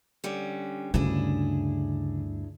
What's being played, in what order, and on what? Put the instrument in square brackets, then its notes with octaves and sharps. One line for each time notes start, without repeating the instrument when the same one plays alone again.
[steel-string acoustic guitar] D3 G3 C#4
[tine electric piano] D2 G2 [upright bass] C#3 [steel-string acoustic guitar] D4 E4 G#4